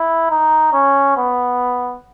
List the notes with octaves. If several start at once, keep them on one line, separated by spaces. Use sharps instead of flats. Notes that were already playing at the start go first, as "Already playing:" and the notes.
Already playing: E4
D#4
C#4
B3